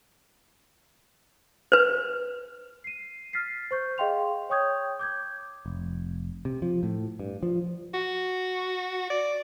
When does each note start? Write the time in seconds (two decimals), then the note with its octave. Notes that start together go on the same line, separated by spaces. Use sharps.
1.72 B4 C5
2.84 C7 D#7
3.33 F6 A6 B6 C7
3.71 C5 C#6 G6
3.98 G#4 D#5 F5 G5 C6 F7
4.50 C#5 G5 C#6 D#6 G6 G#6
4.99 D6 G6 G#6
5.66 F1
6.45 C3
6.62 F3
6.83 A2
7.20 G2
7.43 F3
7.94 F#4
9.10 D5